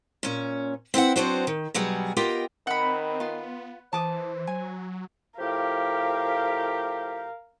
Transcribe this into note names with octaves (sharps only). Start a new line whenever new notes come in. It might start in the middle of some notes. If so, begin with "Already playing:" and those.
A#2 C#4
C4 E4 B4 F#5
F#3 B3 C4 D4 F#4 C5
D#3
B2 F#3 G3 B3 G#4
B3 F4 G4 A#4 D#5 G5
D#3 C4 F#5 B5
B3 F4 C6
E3 C5 A5 D6 D#6
F#3 G#5
A2 F3 G4 A#4 F5